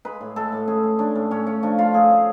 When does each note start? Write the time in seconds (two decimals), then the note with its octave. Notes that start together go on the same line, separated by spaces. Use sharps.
0.05 G#3 B4
0.21 A2
0.36 G#3 A4
0.52 A2
0.68 C#4 G#4
0.83 G#3
0.99 C#4 D4
1.15 A2
1.31 A2 C#4
1.46 A3 C#4
1.62 F3 D4
1.78 A3 F4
1.94 A2 G#4
2.10 C#4